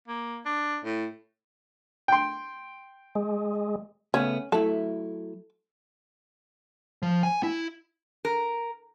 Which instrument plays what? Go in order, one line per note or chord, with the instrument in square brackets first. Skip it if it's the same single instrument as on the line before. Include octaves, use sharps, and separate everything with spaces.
[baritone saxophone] A#3
D4
A2
[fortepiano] G5 C6
[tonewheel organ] G#3
[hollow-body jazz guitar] C#3 A3 B3 [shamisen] C#4
[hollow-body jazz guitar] F#3 A3 E4 [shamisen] A4
[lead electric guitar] F3
G#5
E4
[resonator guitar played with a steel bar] A#4